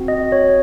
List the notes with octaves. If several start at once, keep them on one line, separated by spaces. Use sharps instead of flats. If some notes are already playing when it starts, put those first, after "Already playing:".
Already playing: C4 F#4
D#5
C#5